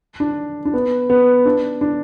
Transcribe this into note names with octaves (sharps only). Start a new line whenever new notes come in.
D4
D4
B3
B3
D4
D4